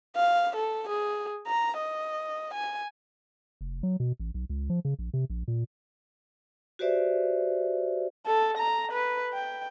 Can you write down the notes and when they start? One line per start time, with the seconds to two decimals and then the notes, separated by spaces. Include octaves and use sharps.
0.16 F5
0.56 A4
0.89 G#4
1.47 A#5
1.78 D#5
2.54 G#5
3.61 F1
3.83 F#3
4.00 B2
4.20 A1
4.34 B1
4.50 C#2
4.70 F3
4.85 C#3
4.99 A#1
5.14 C3
5.30 A#1
5.48 A#2
6.79 F#4 G4 B4 C5 D5 E5
8.26 A4
8.58 A#5
8.92 B4
9.33 G5